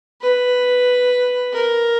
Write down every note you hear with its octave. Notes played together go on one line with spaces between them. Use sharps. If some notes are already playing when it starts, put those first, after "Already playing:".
B4
A#4